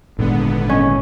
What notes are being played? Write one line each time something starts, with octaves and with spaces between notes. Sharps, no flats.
G#1 A#2 D3 G#3 B3
C#4